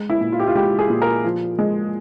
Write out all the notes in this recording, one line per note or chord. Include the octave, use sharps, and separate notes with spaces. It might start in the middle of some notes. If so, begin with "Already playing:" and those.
Already playing: G#3
E4
A#2
F4
G4
F4
G#3 G4
G#4
A#2
A#4
F3
G#3